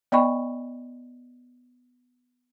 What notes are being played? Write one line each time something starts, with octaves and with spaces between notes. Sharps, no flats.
B3 D5 D#5 G5 B5 C#6